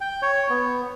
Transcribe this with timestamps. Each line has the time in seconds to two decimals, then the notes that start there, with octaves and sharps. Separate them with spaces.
0.01 G5
0.22 C#5
0.50 B3